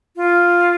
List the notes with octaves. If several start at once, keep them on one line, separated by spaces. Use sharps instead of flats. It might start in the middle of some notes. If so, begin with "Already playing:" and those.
F4